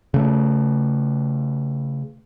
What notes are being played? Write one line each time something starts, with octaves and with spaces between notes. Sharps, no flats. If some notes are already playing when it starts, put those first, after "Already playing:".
C#3 A3